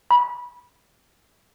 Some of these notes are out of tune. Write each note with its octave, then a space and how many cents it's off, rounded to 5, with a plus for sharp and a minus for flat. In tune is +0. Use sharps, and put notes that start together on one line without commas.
B5 -20